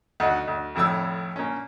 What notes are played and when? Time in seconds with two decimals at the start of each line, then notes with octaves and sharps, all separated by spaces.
0.20 D2 D#4 F#5
0.47 D2
0.75 G#1 F2 A2 E6
1.36 A#2 C#4